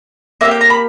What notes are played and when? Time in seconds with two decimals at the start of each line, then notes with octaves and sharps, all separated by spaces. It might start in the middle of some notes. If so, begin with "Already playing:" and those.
0.41 A#3 D4 G4 E5
0.51 G5
0.61 A#5
0.70 B5